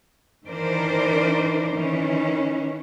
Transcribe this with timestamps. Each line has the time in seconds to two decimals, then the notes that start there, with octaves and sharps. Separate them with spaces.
0.47 D#3 E3 D4 A#4 C5 D5
1.72 D#3 E3 C#4